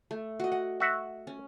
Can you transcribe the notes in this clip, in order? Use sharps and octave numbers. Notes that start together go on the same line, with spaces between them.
A3
F#4 D#5
D#5 F#5
F#4 E5 F#5
C#4